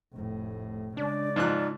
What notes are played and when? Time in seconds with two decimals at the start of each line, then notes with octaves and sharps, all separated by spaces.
0.13 F1 A2
0.97 C#3 G#3 D4 D5
1.36 G#2 F3 D#4 F#6